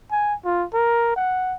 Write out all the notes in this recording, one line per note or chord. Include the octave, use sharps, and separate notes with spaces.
G#5
F4
A#4
F#5